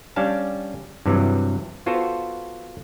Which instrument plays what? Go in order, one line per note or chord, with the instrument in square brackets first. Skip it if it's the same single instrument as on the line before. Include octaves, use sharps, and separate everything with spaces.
[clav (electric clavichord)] G3 C#4 D4 F5 A5
G2 C3 E3 F#3
B3 F4 F#4 A4 C5